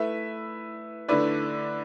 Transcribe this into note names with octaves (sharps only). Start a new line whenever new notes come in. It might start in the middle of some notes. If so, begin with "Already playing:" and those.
Already playing: A3 E4 B4 E5
D3 A3 E4 B4 D5